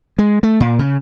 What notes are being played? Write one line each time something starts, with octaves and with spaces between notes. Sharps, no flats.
G#3
A3
A#2
C#3